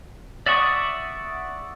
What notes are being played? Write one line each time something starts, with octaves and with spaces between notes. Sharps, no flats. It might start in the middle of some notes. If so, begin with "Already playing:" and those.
D5 E5 F#5 C#6 D#6